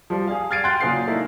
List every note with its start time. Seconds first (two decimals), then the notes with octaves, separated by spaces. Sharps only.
0.10 F3 G3
0.27 G#4 F5
0.51 F6 G#6 A6 C7 D7 D#7
0.64 F#5 G5 C6 F#6 G6 A6
0.81 A#2 C#3 F#3 G#4 F5 C7
1.07 A3 A#3 D#4 E4